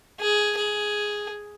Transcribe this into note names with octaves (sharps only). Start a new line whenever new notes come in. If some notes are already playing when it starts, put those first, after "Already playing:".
G#4
G#4